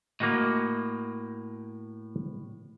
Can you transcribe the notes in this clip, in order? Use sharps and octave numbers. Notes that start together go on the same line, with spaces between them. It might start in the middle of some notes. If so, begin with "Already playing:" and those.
A2 A#3 F#4 D#5